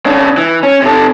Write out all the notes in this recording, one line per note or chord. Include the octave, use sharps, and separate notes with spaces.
C#3 D4
E3
C#4
C3 A4